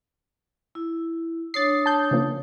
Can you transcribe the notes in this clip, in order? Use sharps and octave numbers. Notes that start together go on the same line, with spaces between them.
E4
D4 C#5 D#6 A6 C7
A5 G6
C#3 F3 A#3